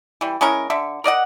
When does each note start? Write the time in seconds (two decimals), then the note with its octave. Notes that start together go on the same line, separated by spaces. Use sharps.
0.21 E3 G3
0.41 G#3 C#4 E4 A#4
0.70 D3 E5
1.04 A#4 D5 D#5 F#5